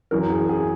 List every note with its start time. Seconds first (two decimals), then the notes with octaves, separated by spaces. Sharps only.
0.11 F#2 E3 A#4
0.30 G#4
0.49 G#4